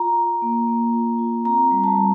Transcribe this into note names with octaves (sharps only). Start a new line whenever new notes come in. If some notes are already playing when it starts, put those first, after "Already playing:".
Already playing: F4 A#5
F4
A#3
A#3
F4
F4
C4 A#5
G3
A5
G3